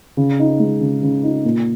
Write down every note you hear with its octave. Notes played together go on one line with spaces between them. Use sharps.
C#3
D#4
G#3
C#3
C#3
D#4
A#2